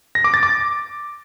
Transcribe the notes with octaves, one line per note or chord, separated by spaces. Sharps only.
A#6
D6
A6
D6